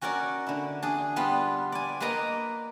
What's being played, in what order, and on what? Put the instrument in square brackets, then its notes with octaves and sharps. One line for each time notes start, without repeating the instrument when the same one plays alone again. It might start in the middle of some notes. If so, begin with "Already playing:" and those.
[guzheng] C#4 F#4 A#4 C#5 D5
D3 E4
D4 G#4
G3 B3 F4
D5 G#5
A#3 B4 D5 D#5 A#5